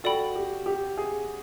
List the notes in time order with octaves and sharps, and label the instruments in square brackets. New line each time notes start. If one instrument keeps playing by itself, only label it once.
[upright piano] F#4 [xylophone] A4 D5 G5 B5
[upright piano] G4
G4
G#4